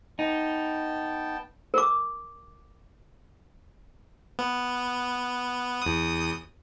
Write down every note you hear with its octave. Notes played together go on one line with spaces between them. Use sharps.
B3 D#4 G5 A5
A#4 D6
B3
E2 D#6